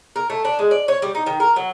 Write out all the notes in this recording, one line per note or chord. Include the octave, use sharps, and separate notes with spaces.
A#4
A3
D4
G#3
D5
C#5
G3
D#4
D#3
A#4
F#3